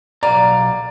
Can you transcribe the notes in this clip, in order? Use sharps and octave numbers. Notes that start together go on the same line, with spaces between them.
B1 D5 F5 A#5